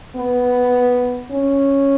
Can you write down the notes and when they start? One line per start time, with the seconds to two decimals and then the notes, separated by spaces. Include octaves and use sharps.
0.16 B3
1.31 C#4